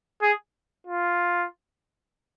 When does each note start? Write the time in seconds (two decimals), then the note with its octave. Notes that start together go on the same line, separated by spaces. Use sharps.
0.22 G#4
0.87 F4